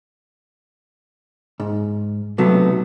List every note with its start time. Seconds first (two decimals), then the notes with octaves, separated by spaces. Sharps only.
1.60 G#2
2.38 B1 C3 F#3 A3 B3